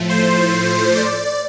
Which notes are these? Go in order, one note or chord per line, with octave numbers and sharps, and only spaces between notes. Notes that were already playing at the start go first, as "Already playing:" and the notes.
Already playing: A2 F3 A3
C5
D5